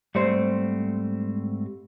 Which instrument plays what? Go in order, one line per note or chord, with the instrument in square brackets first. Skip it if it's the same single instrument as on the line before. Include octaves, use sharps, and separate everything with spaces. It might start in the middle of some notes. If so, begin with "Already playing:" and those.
[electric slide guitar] G#2 A3 C4 [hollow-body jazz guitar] G3 C5